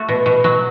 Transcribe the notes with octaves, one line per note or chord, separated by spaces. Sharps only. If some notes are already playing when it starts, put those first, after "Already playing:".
Already playing: A3 F#4
B2
B2
F#3